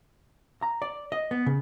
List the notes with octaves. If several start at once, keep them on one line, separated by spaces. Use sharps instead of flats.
A#5
D5
D#5
B3
C#3